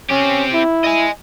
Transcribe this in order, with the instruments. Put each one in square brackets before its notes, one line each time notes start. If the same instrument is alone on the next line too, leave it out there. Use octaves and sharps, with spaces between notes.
[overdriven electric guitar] C4 G4 [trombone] C#4
[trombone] E4
[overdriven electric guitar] D#5 G#5